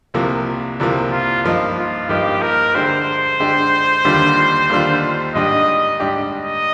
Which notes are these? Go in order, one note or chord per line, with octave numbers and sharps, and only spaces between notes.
C2 C3 F3 A#3
C2 C3 F3 A#3
F4
G2 F3 A#3 D#4
F4
G2 F3 A#3 D#4 G4
A#4
D3 G#3 D4 G4 C5
D3 G#3 D4 G4
D#2 D3 G3 D4 F4
D#2 D3 G3 D4 F4
G#2 G3 D4 G4 D#5
G#2 G3 D4 G4
D#5